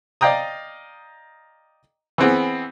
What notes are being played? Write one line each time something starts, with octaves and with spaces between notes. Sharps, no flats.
D5 D#5 F5 G5 A#5 D#6
E3 B3 C4 G#4